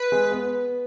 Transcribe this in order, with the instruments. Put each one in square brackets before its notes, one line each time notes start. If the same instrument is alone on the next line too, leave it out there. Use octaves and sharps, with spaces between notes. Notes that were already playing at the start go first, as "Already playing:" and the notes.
Already playing: [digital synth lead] B4
[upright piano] G#3 G#4
B3 B4